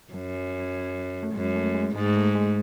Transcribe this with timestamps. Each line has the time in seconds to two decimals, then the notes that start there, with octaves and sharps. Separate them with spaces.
0.13 F#2 F#3
1.23 A3
1.34 F#2 G#3
1.55 A3
1.75 G#3
1.95 G#2 G#3
2.16 A3
2.35 G#3